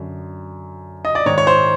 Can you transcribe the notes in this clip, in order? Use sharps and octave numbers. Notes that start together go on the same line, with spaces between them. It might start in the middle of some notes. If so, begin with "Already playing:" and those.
Already playing: F#2 D3
D#5
D5
G#2 D#3 C#5
C#5
C5